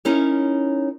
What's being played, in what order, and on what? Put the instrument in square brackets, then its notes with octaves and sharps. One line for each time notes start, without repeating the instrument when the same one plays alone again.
[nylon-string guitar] C#4 D#4 E4 A#4 C#5